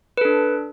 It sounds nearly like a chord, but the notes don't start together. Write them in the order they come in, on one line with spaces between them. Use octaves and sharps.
B4 A4 D4